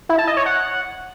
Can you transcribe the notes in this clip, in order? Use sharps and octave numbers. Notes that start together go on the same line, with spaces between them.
E4
A5
D#5
C#5
F#5